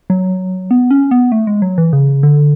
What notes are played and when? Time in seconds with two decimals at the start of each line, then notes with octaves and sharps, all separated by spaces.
0.10 F#3
0.71 B3
0.91 C#4
1.11 B3
1.32 A3
1.47 G#3
1.62 F#3
1.78 E3
1.93 C#3
2.23 D3